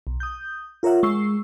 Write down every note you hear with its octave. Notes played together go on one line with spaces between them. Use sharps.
B1
D#6 G6
F4 A#4 C#5 E5 F#5
G#3 C#6 E6 C7